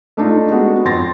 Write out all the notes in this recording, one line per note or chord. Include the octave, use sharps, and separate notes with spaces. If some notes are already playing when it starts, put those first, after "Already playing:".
A3 D4 D#4 F4
G#3 A3 B3 F#4
F2 C6 A6 A#6